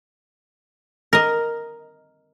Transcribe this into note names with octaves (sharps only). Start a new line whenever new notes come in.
A#4 D#5